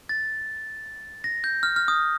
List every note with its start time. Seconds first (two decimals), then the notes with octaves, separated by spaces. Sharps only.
0.09 A6
1.24 A#6
1.44 G6
1.63 F6
1.76 F6
1.88 D#6